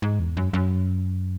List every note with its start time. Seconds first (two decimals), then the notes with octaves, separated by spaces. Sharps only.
0.02 G#2
0.20 E2
0.37 F#2
0.53 F#2